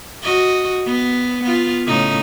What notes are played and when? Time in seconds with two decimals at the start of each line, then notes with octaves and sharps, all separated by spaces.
0.24 F#4 D#5
0.86 B3
1.43 B3 F4
1.87 A2 C#3 D#4